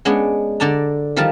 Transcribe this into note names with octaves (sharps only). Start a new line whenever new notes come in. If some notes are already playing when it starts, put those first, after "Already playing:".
G#3 B3 C#4 D4
D3 D5 A5 A#5
D#3 F3 G3 A#4 A5